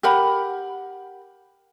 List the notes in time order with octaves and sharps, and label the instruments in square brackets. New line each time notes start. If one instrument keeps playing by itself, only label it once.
[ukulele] G4 A#4 F#5 B5